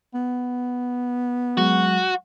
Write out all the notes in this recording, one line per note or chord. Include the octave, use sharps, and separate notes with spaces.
B3
F#3 G#3 F#4